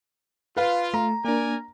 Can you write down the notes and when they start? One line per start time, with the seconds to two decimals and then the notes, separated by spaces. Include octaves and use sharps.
0.57 F4 B4 F5
0.94 A3 A#5
1.25 A#3 D4 A#4 D5 G#5